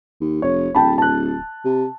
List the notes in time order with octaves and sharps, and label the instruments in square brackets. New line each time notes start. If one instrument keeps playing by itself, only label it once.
[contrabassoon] D#2
[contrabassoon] F1 [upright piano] C#5
[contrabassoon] D1 [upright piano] G5 A5 B5
[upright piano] A5 F#6
[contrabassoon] C3